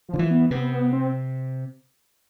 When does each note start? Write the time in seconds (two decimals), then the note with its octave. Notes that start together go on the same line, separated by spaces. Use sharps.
0.09 F3
0.14 D3
0.19 E3
0.30 B3
0.51 C3 B3
0.72 B3
0.93 C4